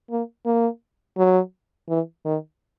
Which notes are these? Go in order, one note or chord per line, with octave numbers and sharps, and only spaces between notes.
A#3
A#3
F#3
E3
D#3